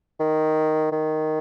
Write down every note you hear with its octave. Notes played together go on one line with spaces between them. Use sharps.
D#3
D#3